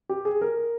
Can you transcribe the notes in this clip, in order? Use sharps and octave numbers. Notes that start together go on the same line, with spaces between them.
G4
G#4
A#4